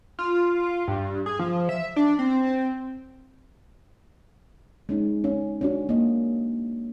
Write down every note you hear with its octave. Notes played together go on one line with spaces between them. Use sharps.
F4
G2
G#4
F3
E5
D4
C4
G#3 C#4 D#4
C#4
C#4 D4 F#4
A#3 D#5